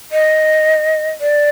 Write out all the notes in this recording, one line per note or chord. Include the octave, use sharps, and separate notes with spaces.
D#5
D5